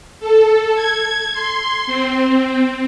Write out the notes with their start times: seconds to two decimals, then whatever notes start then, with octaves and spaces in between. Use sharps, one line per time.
0.20 A4
0.75 G#6
1.33 C6
1.86 C4